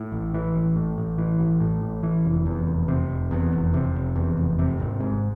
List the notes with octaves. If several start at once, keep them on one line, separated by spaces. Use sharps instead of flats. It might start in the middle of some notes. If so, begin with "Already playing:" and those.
Already playing: A2
A1
E3
A1
A2
A1
E3
A1
A2
A1
E3
F1
E2
F1
C3
F1
E2
F1
C3
F1
E2
F1
C3
G#1
G#2